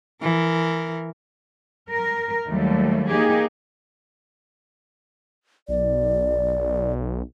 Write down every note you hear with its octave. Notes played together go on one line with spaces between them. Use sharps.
E3 A#4
A#4
D#2 F#3 G3 A3
A#3 D#4 G4 G#4
B1 D5